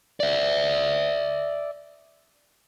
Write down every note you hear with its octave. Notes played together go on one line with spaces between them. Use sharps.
D5 E5